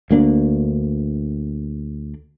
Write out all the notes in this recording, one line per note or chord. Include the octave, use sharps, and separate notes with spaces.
D2 A#3 D4